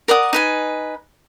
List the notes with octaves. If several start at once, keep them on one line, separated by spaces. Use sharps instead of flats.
A#4 D5 F#5 D#6
D#4 B4 G#5